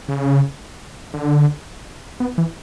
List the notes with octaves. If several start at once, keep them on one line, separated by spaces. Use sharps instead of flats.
C#3
D3
B3
E3